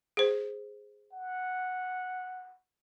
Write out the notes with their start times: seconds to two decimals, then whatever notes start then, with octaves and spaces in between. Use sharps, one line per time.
0.17 G#4 C5
1.12 F#5